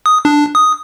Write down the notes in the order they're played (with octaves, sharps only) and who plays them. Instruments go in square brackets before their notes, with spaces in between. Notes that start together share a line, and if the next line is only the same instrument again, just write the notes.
[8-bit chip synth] D#6
D4
D#6